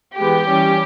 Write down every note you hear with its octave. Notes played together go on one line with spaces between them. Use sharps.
E3 G#3 B3 G4
E3 G3 C#4